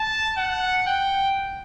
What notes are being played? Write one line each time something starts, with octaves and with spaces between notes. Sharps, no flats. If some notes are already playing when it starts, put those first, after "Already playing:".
Already playing: A5
F#5
G5